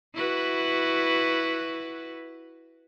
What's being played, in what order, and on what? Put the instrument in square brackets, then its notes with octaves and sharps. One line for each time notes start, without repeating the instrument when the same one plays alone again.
[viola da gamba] E4 F#4 B4